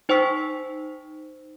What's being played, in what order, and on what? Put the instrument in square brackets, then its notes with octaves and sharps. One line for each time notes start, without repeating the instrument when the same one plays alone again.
[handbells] D#4 C5 G5 C#6 E6 B6